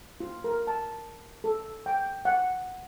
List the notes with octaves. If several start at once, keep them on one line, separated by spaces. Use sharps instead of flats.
F4
A#4
A5
A4
G5
F#5